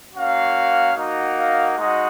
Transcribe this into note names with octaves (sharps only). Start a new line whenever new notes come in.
A#3 C#4 F#4 F5
A#3 D#4 F#4
F5
G#3 D#4 F#4 D#5